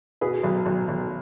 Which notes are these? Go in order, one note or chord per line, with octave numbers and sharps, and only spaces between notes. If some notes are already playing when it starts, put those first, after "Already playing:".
B2 G#4 B4
B1
B1
B1